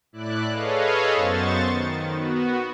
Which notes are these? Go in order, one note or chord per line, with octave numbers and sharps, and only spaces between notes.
A2 E4 D5 F#6
G#4 A4 B4 C#5 D#5 F5
F#2 B3 C5 C#6 A6
D#3
B3 F#4